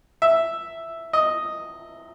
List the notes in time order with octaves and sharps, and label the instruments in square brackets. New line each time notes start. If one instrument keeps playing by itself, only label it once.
[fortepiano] E5
D#5